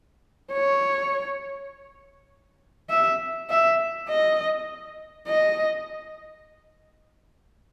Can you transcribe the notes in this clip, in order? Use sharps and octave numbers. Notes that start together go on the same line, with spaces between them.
C#5
E5
E5
D#5
D#5